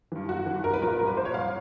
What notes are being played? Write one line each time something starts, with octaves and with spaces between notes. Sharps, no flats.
G2 E3
G1 F#4
G2 E3
C2 A#4
B4
A#2 F3 A#4
C2 A#4
B4
A#2 F3 C5
C#5
C2 F5